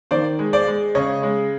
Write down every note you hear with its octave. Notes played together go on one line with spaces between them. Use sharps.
D#3 C5 D5
G#3
C5 D5
G#3
C#3 C#5 D#5
G#3